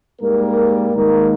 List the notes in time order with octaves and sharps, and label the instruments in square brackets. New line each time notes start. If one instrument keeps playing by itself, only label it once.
[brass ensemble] G#2 G3 A#3 A#4
G#2 D#3 A#3 A#4